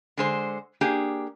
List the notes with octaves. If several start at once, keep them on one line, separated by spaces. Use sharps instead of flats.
D3 G#3 C5
A#3 D4 G4 G#4